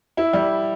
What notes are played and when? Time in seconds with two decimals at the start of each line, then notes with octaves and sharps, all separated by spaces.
0.17 E4
0.33 G3